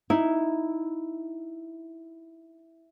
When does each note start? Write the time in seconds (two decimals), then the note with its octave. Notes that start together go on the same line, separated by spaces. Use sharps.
0.10 D#4 E4